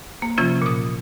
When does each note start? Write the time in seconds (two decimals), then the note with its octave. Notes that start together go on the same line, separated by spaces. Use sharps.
0.22 A#3
0.38 C3 E3 F3 C#4 F4
0.62 A#2 D#6